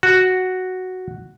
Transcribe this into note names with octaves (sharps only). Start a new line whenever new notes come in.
F#4